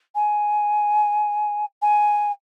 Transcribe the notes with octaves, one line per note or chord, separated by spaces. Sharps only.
G#5
G#5